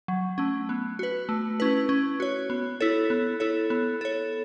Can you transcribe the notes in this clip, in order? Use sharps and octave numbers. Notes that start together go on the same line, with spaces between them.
F#3
A3 C#4
B3
F#4 B4
A3
C#4 E4 B4
C#4
F#4 C#5
B3
E4 A4 C#5
B3
E4 A4 C#5
B3
A4 C#5